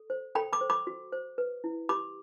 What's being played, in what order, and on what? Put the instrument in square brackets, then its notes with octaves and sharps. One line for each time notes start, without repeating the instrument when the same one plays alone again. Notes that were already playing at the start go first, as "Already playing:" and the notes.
Already playing: [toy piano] A4
C5
A4 G5 B5
B5 D6
C5
B5 D6
F#4
C5
B4
E4
G4 B5 D6